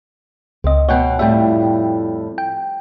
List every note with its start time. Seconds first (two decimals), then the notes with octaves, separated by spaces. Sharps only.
0.64 C#2 C4 D#5
0.89 B2 C#5 F#5 G5
1.19 F2 A2 G3 E5 G5
2.38 G5